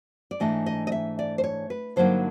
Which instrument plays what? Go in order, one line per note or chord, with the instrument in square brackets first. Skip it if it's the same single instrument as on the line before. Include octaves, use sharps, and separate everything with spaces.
[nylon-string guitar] D5
G#2 E3 A3 D4 D#5
D#5
D#5
E5
D5
C5
C#5
B4
G2 D3 F#3 A#3 D#4 C5